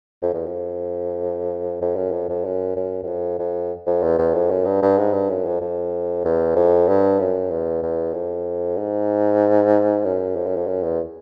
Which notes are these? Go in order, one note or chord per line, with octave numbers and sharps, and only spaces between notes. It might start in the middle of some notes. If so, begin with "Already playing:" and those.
F2
E2
F2
F2
F#2
F2
F2
F#2
F#2
F#2
F2
F2
F2
E2
E2
F2
F#2
G2
G2
G#2
G2
F#2
F2
F2
E2
F2
G2
F#2
E2
E2
F2
G#2
F#2
F2
F#2
F2
F#2
E2